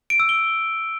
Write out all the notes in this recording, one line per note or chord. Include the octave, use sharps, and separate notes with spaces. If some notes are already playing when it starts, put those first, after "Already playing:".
D7
E6
G7